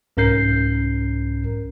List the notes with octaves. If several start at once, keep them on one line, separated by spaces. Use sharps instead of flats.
C2 G#2 C#4 A#4 G6 C7